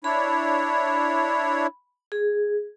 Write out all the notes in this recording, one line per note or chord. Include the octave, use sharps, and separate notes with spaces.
D4 E4 C#5 B5
G#4